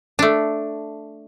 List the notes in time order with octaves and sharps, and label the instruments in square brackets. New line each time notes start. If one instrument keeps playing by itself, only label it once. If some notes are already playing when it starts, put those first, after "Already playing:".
[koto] A3 D4